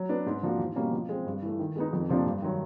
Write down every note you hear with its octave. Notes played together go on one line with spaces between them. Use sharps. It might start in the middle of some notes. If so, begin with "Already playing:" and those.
Already playing: F#3
B3 D4
G#2
F3 A#3 D4 F#4
E2
B2 G3 A#3 C#4
F3
G#3 C4
G2
E3 A3
D#3
G#3 B3 D#4
F2
C3 F3 A#3 D4
G2
D#3 F#3